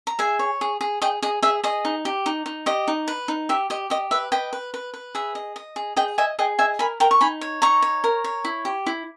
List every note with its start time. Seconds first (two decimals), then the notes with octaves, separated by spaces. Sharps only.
0.07 A#5
0.19 G#4 E5 G#5
0.39 C#5
0.61 G#4
0.81 G#4
1.02 G#4 D#5 G5
1.23 G#4 D#5
1.43 G#4 E5
1.64 G#4 D#5
1.85 D#4
2.05 G4
2.26 D#4
2.46 D#4
2.66 G4 D#5
2.88 D#4
3.08 B4
3.28 D#4
3.49 G4 E5
3.70 G4 D#5
3.90 G4 D#5
4.11 B4 E5
4.32 B4 D#5 G5
4.53 B4
4.74 B4
4.94 B4
5.15 G#4 E5
5.35 D#5
5.56 D#5
5.76 G#4
5.96 G#4 D#5 G5
6.18 D#5 E5 G#5
6.39 G#4 D#5 G5
6.59 D#5 E5 G#5
6.79 A#4 G#5 B5
7.00 A#4 G5 A#5
7.11 C#6
7.21 D#4 G#5 B5
7.41 C#5
7.62 D#4 A#5 C#6
7.82 C#5
8.04 A#4
8.24 C#5
8.45 E4
8.65 G4
8.87 E4